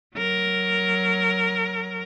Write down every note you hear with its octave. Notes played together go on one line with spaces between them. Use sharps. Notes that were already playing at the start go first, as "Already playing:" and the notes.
F#3 A#4